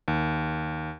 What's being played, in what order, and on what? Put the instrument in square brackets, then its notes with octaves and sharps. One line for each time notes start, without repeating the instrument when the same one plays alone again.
[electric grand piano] D#2